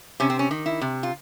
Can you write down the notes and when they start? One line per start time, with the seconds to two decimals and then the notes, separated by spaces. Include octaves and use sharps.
0.20 C3 C#4
0.30 C4
0.39 C#4
0.51 D#3
0.66 E4
0.81 C3
1.03 F4